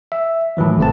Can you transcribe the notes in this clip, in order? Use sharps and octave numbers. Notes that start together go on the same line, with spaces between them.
E5
A2 D#3 E3 F#3
G#1 C3 A3 C4 A5